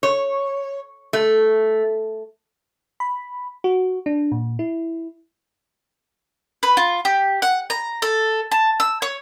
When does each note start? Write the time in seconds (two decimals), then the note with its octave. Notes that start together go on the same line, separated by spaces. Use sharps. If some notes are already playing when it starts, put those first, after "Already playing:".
0.03 C#5
1.13 A3
3.00 B5
3.64 F#4
4.06 D4
4.32 A#2
4.59 E4
6.63 B4
6.77 F4
7.05 G4
7.42 F#5
7.70 A#5
8.02 A4
8.52 A5
8.80 E6
9.02 C#5